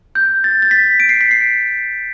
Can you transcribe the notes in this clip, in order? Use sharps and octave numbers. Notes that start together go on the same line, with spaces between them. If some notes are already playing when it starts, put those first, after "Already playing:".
G6
A6
A6
B6
D7
C7
B6
C7